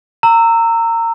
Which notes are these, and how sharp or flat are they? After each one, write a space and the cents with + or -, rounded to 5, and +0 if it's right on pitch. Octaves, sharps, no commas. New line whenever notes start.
A#5 -25 E6 +0